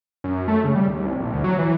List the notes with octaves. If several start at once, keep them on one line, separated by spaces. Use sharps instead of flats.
F#2
A3
C#3
G3
D#2
C2
A#1
D2
F#3
E3